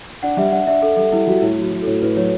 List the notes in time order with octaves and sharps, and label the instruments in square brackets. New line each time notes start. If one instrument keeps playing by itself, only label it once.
[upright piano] D4 [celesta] F#5
[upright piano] G3 [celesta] E5
[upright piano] D4 [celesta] F#5
[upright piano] D4 [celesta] E5
[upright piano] D4 [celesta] A4
[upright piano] G3 [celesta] A4
[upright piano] G3 [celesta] E4
[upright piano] G3 [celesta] F#4
[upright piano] A2 [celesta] E4
[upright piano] F#3 [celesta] F#4
[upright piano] F#3
[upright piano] A2 [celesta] A4
[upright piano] A2 [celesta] B4
[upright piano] F#3 [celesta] C#5